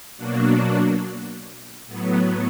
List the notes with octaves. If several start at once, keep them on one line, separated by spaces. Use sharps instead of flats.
B2 F#3 A#3 D4 F#4
A2 F#3 B3